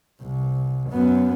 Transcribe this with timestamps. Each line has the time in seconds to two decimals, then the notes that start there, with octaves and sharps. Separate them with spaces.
0.21 C2
0.91 F#2 B3